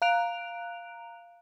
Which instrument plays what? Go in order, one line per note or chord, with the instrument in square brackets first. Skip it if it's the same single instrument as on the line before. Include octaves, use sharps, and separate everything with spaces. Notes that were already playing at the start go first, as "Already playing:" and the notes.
[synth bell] F5 A#5 F#6 D7 F7